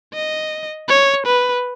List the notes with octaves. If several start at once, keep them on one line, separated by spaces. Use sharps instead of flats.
D#5
C#5
B4